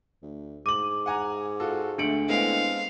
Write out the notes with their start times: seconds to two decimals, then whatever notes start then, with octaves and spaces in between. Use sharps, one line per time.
0.22 D2
0.66 G#2 D6 D#7 F#7
1.06 F#5 G#5 A#5
1.60 F4 F#4 A4
1.98 D2 A3 D4 C#7 D7 F#7
2.29 A2 G#3 B3 C4 F5